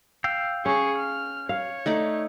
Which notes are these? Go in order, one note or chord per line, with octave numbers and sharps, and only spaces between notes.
F5 G5 E6
C#4 G#4 C#6
F6
C#5 F5
A3 D#4 D5